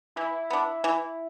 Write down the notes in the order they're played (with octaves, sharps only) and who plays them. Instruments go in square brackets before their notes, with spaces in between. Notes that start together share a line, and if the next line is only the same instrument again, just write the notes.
[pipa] E3 [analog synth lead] E4
[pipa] B3 D4
[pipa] E3 [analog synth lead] E4